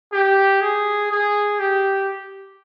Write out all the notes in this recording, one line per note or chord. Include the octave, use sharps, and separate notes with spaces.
G4
G#4
G#4
G4